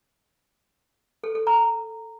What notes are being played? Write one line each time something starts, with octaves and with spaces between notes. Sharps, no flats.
A4
A4
A#5